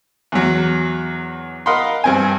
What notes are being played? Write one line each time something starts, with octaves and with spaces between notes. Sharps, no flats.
E2 F#3
A#4 D#5 F5 F#5 B5 C6
G2 C4 G#5